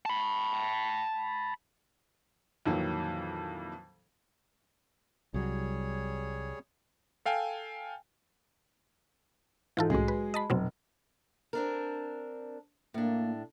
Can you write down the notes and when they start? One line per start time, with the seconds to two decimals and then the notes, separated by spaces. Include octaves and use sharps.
0.06 A5 B5
2.66 F2 A#2 D#3 E3 F#3
5.34 C2 F#3 G3 G#4 C#5
7.25 A4 F5 G5 G#5
9.77 G#2 E3 F4 A4
9.90 C2 A2 F#3 G#3 G#4
10.08 B4
10.34 D#5 A5 B5
10.50 F1 B2 F#3 C4
11.53 C4 D4 A#4
12.94 A2 A#3 D4